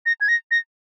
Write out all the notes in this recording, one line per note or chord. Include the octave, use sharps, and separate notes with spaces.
A#6
G#6
A#6
A#6